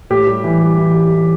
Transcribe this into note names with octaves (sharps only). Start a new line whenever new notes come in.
A2 G4
G3
E3
G3
E3
G3
E3